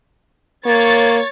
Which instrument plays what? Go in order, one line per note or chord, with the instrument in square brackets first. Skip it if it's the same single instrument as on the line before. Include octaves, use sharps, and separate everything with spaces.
[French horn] A#3 [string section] C#5 A6